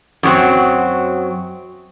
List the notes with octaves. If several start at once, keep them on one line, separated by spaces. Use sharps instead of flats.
F#2 F#3 C4